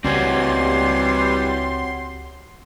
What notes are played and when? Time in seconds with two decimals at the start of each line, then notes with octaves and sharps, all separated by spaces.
0.04 C#2 E3 G3 C4 F#4 C#5 C6